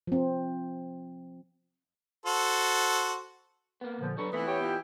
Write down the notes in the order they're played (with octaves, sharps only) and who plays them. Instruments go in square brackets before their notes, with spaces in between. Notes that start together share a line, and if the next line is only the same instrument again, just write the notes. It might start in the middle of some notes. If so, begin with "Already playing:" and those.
[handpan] F3 C4
[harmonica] F#4 A4 C5
[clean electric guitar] A#3 B3
[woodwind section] A#2 D3 F3
[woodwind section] F#3 D4 C#6 [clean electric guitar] G3 A4 B4
[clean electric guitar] C3 A3 [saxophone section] E3 B3 [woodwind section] B5
[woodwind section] G4 G5 [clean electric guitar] C#5
[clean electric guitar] B2 F4